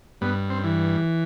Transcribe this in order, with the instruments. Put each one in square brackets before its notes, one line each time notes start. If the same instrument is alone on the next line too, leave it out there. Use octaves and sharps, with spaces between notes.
[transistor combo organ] G2 B3
C4
E3